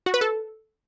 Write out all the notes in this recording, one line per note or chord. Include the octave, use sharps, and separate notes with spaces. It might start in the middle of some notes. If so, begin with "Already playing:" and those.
F#4
B4
A4